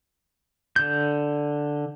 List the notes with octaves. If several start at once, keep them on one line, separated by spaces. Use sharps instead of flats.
D3 G6